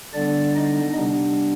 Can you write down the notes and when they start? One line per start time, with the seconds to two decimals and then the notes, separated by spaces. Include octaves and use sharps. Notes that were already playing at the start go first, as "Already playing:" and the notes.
0.14 D3 G3 B3 D4 D5
0.55 D#4 D#5
0.97 C3 G3 B3 D4